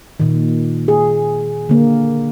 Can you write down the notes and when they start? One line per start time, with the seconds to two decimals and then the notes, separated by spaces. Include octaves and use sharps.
0.20 A#2 D#3
0.88 G#4
1.69 D3 A#3